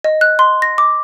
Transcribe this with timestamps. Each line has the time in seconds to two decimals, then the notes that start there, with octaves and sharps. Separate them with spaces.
0.04 D#5
0.21 F#6
0.39 C6
0.62 A#6
0.78 D6